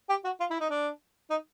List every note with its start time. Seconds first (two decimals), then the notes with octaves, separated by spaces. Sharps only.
0.09 G4
0.24 F#4
0.40 F4
0.50 E4
0.61 D#4
0.70 D4
1.30 D#4